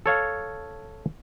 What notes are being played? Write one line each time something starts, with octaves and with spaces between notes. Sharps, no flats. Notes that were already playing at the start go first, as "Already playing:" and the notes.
A4 C#5 F5